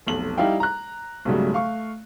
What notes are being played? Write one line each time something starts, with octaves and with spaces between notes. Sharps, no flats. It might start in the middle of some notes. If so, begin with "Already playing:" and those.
F1 B1 F#7
G3 D#4 E4 D5 F5 G5
A#5 F#6
B1 G#2 C#3 F#3 G3 A3
A3 F5 C#6